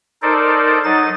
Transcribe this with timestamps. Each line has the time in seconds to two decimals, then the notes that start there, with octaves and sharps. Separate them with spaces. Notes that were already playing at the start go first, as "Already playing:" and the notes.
0.22 D#4 A4 A#4 C5 D5
0.84 F#3 D#4 D#5 A6